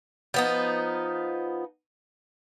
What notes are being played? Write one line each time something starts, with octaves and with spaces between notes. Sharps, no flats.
F3 B3 D#4